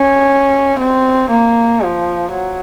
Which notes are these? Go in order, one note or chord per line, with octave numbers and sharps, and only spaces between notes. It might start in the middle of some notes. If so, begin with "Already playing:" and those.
Already playing: C#4
C4
A#3
F3
F#3